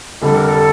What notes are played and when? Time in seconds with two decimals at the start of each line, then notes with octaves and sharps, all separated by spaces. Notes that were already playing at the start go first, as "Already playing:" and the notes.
0.22 F1 F2 D3 G3 A4
0.35 A#4
0.48 A4